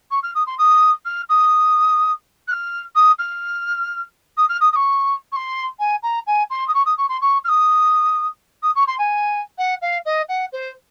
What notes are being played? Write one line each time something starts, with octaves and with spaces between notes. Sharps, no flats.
C#6
F6
D#6
C6
D#6
F6
D#6
F#6
F6
D#6
F6
D#6
F6
D#6
D#6
C#6
C#6
C6
G#5
A#5
G#5
C6
D#6
C#6
D#6
C#6
C6
C#6
F6
D#6
D#6
C#6
C6
G#5
F#5
F5
D#5
F#5
C5